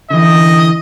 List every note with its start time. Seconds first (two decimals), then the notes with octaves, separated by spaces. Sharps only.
0.10 D3 E3 D#5